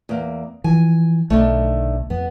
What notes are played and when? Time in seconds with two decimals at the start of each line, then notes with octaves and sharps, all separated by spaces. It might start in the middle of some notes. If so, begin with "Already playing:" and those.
0.09 E2 A#3
0.64 E3 F3 G#5
1.30 B1 D3 D#3 A3
2.10 F2 B3